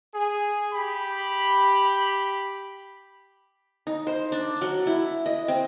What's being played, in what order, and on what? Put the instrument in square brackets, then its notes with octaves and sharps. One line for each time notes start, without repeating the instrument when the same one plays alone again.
[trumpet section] G#4
G4 B5
[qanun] D#4
C5
D4
F#3
E4
D#5
C4